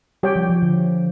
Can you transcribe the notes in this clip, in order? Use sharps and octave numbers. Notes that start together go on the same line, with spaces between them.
G3 G4 C#5 G5
F3
F3
D3